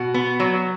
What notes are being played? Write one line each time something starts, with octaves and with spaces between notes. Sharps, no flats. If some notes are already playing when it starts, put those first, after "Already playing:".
Already playing: B2 F#4
B3
F#3